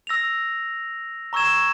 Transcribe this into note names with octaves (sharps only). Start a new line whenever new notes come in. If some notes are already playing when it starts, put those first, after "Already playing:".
E6 A#6 F7
A#5 C#6 E6 G#6 E7